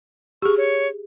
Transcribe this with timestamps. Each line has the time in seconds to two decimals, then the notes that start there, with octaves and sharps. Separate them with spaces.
0.42 G4 G#4 C#6
0.57 C#5